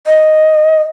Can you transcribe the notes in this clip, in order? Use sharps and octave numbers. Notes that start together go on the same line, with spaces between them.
D#5